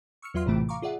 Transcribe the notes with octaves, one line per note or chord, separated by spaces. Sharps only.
C#6 E6 F6 C#7
E2 F#3 F4 E5 C6 F6
A#1 A2 C3 E3 A3 D7
F5 A#5 C#6 D6
F4 G#4 D5 E5 F#5